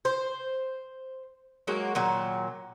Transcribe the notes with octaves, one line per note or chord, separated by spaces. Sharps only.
C5
F#3 G#3 A#3 F#4
A#2 D#3 F#3